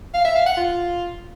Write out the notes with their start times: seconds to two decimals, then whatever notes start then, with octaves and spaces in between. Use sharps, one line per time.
0.14 F5
0.25 E5
0.35 F5
0.46 F#5
0.57 F4